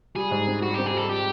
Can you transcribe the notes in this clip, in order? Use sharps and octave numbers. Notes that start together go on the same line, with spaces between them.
G3 G#4
G#2
C4
G3 F#4
C4 G4
G#4
G3 A4
G3 G4